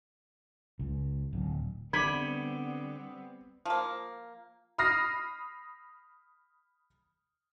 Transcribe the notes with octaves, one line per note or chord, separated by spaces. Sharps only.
C#2
D1
D3 G3 B3 C4 B5 D6 G#6
F3 A#3
B5 D#6 F6 A#6 C7